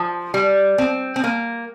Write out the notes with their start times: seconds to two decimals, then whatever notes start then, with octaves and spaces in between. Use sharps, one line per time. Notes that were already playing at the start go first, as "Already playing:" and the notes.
Already playing: F3
0.34 G3
0.78 C4
1.16 C4
1.24 A#3